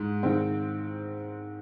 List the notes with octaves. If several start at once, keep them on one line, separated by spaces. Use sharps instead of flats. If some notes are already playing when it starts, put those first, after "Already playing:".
Already playing: G#2 G#3
G#2 D#3 G#3 C4